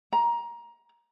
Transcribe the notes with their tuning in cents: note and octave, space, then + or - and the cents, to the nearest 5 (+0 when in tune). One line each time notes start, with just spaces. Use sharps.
A#5 +20